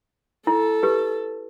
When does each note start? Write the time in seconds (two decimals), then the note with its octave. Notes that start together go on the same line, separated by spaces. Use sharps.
0.47 E4 A4
0.83 G4 B4